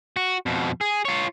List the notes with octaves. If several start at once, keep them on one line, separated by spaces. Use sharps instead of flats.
F#4
F2 B2
G#4
F4 C#5